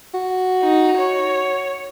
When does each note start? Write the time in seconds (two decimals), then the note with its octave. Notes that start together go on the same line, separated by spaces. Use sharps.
0.14 F#4
0.63 D#4
0.98 C#5